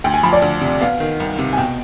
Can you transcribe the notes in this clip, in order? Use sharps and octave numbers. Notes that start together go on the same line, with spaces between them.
D2 G5
G#5
F3 B5
D5
D2
C3
B3 F5
D#3
C2
C3
G#5
B2 G5